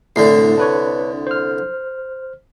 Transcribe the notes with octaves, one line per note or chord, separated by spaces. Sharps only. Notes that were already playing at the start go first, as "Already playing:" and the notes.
C2 A2 D3 A3 C7
D4 B4 C#5
C5 F6